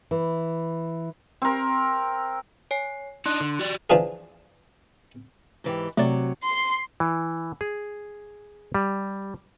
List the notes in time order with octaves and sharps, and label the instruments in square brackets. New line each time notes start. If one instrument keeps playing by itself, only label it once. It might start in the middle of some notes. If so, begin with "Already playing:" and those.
[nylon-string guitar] E3
[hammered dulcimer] C4 A#4
[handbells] C#5 G#5 C7
[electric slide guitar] D4 D#4 [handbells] C6 F#6
[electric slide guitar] D3
F#4 G4 D5
[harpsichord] E3 F3 D4 F4 G#4
[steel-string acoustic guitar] G#2 E3 G4
[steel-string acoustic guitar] C3 F#3 [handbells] A3 D5
[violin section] C6
[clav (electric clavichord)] E3
G#4
G3